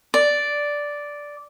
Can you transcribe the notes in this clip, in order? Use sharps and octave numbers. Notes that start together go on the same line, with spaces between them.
D5